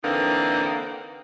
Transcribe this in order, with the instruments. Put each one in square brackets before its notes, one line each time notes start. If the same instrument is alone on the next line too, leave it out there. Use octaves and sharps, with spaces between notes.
[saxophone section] D3 E3 A#3 C4 D#4